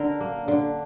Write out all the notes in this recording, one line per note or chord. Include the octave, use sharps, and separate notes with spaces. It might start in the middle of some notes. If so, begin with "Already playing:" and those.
Already playing: D3 A#4
A#3
D3